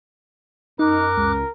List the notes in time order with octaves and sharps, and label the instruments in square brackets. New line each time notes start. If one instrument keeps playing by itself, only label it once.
[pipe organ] F#2 D6 F#6 [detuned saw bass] D#4 [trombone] A#4
[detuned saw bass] C#2